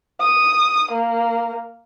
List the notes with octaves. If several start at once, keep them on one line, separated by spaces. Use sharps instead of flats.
D#6
A#3